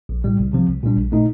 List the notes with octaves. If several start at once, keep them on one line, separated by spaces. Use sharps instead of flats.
A#1
A2 G3
C2
C3 F3 C4
C2
A#2 G3 D4
A#1
A#2 A3 D#4